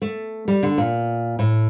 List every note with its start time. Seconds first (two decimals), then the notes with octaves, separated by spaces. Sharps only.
0.02 A3
0.48 G3
0.63 D3
0.78 A#2
1.39 A2